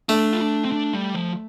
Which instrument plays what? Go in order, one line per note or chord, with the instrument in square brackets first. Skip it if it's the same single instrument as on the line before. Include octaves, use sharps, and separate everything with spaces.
[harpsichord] A3 [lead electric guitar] D4
[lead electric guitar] F4
D4
C4
D4
G3
F3